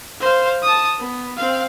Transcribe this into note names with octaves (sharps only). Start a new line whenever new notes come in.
C5 F5
A5 D#6
B3
C4 F5